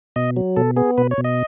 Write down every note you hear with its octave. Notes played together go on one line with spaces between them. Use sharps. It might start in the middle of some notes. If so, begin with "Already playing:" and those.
B2 D#5
F#3
B2 A4
B3 G#4
B2 B4
C#5
B2
D#5